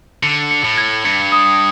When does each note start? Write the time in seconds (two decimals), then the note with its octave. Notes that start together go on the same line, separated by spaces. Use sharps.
0.23 D3 C#7
0.51 C#7
0.64 A2
0.78 G#6
1.05 G2 C#7
1.32 D#6